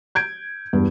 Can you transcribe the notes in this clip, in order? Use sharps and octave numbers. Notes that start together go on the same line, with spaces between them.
G6 G#6 D7
E2 G2